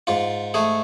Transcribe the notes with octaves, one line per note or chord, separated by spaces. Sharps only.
G#2 F4
A3 G#4